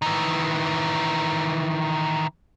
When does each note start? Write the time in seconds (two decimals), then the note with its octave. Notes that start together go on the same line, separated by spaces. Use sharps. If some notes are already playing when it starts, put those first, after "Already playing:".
0.02 D#3 E3